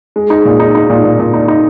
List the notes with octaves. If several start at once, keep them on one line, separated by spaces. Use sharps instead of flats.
G#3
D#4
A#2
D#4
D#4
A#2
A#2
A#2
D#4
D#4